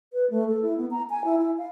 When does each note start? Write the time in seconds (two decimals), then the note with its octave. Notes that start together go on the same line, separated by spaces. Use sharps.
0.13 B4
0.30 A3
0.49 A4
0.62 E4
0.77 B3
0.91 A#5
1.10 G#5
1.25 E4
1.38 E4
1.58 F5